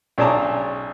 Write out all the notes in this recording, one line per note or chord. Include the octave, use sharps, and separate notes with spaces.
B1 C#4 D4 G#4 A5 A#5